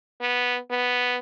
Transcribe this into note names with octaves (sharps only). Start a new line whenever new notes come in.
B3
B3